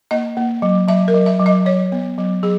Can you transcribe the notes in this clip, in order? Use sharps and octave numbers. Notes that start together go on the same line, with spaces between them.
A#3 D#5
A#3
F#3
F#3 E5
A#4
F#3
E5
F#3
D#5
F#3 C#5
B3
F#3
F#3 G#4